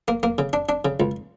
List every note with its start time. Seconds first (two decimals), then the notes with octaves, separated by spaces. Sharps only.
0.08 A#3
0.23 A#3
0.38 C#3
0.53 D4
0.69 D4
0.85 C#3
1.00 C#2